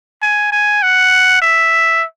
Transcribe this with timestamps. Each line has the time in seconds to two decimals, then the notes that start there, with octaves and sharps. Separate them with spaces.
0.22 G#5
0.52 G#5
0.83 F#5
1.42 E5